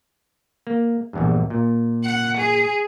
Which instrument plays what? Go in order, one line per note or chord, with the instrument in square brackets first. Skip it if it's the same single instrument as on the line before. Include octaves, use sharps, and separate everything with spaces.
[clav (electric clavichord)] A#3
A#1 E2 G2
A#2
[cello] F#5
G#4